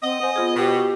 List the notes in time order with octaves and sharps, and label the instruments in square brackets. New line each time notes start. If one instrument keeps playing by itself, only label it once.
[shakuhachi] C4 [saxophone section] D#5 [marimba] F#5
[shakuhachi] C5 [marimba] F#5 G#5
[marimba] B3 F4 G#4 [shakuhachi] C5
[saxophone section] B2 [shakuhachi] G4